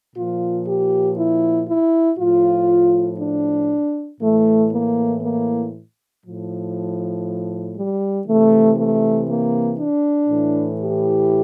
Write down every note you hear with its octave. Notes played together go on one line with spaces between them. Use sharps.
A#2 F3 F4
G4
E4
E4
A2 F3 F4
D4
A2 E3 A3
A#3
A#3
A2 F3
G3
C3 E3 A3
A3
A#3
D4
A2 E3
G4